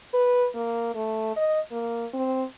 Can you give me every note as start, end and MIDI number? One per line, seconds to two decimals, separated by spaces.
0.14 0.47 71
0.55 0.89 58
0.95 1.35 57
1.36 1.60 75
1.72 2.06 58
2.14 2.43 60